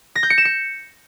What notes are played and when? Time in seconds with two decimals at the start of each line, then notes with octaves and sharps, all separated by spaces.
0.15 A#6
0.23 G6
0.30 C#7
0.38 E7
0.45 C#7